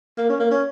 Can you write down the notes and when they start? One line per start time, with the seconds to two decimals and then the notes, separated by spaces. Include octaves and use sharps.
0.18 A#3
0.29 C#4
0.40 A#3
0.51 C#4